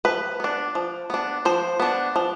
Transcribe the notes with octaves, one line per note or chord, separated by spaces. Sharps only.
F3 B4
B3 D4
F3
B3 D4
F3 C5
B3 D4
F3